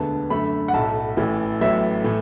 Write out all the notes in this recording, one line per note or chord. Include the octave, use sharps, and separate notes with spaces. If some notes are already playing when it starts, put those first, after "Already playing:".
Already playing: E1 D2 D3 B3 A5
F#2 D3 A3 B5
F#5
B1 A2 A3 A5
A1 A2 E3
A1 A2 F#3 B3 E5
A2 E3 A3